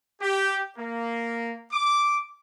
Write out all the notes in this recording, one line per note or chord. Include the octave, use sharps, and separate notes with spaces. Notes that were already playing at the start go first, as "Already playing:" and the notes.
G4
A#3
D6